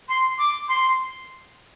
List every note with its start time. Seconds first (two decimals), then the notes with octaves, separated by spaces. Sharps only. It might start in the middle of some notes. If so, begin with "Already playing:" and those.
0.09 C6
0.39 D6
0.69 C6